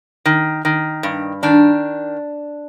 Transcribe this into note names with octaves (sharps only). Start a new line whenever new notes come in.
D#3
D#3
G2
D#3 D4